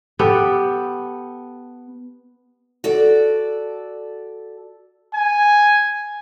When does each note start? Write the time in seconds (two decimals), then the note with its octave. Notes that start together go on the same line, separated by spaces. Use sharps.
0.19 B3 G4 A4
2.84 F#4 A4 D5
5.14 G#5